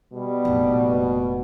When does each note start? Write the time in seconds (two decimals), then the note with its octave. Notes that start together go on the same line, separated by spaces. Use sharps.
0.13 B2 G3
0.45 F1 A#2